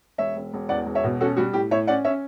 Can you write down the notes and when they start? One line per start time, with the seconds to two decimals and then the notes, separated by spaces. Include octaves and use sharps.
0.18 E1 C#5 E5
0.36 E1
0.53 E1
0.69 E2 D5 F#5
0.86 E1
0.95 C#5 E5
1.04 B2
1.21 C#4 F#4 A4
1.37 G3 F#4
1.53 A2 G4
1.71 A2 C#5 E5
1.87 C#4 D5 F#5
2.04 C#4 C#5 E5